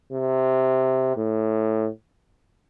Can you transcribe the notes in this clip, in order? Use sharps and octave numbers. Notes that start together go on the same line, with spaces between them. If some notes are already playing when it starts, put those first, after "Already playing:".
C3
A2